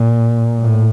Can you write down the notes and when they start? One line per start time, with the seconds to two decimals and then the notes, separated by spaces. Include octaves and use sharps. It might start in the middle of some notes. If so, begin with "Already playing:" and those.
Already playing: A#2
0.61 A2